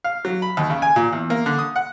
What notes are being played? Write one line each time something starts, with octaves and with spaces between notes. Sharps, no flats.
F5
F#3
B5
D#2
C#3
G#5
A#2
E2
A#3
D3
D#6
F#5